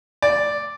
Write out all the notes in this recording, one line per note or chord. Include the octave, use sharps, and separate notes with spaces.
D5